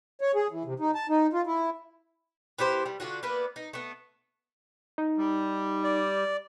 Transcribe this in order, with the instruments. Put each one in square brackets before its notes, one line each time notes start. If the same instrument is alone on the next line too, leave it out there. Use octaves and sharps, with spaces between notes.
[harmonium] C#5
G#4
E3
C3
D#4
A5
D#4
F4
E4
[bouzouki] B3 E4 G4 C5
G3
D3 F4 F#4
A#3 B3 D4 B4
D#4
A3 B3
[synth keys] D#4
[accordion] G3
[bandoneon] D5